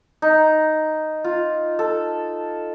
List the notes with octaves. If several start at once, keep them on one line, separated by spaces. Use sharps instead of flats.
D#4
F4
A4